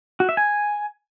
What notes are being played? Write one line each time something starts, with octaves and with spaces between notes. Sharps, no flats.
F#4
E5
G#5